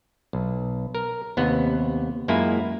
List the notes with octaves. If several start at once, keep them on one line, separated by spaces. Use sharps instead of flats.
B1
A#4
D#2 C3 B3
F#2 G#3 A#3 E4 F4 G#5